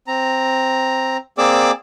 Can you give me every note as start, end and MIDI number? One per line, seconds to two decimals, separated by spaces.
0.07 1.17 60
0.07 1.17 82
1.38 1.71 58
1.38 1.71 60
1.38 1.71 68
1.38 1.71 74
1.38 1.71 86
1.38 1.71 88